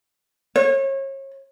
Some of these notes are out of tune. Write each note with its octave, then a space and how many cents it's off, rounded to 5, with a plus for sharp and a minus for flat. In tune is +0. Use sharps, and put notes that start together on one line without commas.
C#5 -35